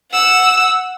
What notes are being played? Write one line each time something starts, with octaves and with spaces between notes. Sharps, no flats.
F#5 E6